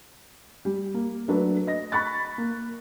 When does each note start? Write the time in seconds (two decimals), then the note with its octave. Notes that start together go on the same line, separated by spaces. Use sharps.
0.65 G3
0.94 A#3
1.28 F#3 A3 D4 B4
1.67 D#5 A#6
1.92 B5 C#6 F#6 A6
2.38 A#3